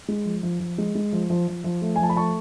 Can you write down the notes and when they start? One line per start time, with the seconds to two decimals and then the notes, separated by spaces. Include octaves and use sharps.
0.08 G#3
0.25 F3
0.43 F3
0.60 F3
0.78 G#3
0.95 G#3
1.13 F3
1.30 F3
1.48 F3
1.64 F3
1.82 A3
1.96 G#5
1.99 F3 A5
2.09 B5
2.16 A3 A5 C#6